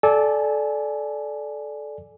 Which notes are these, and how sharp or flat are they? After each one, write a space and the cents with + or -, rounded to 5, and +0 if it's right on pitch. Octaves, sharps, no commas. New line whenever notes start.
A4 -20 D5 +0 G#5 +0